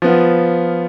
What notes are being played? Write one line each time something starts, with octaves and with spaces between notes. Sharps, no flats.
F3 B3 F4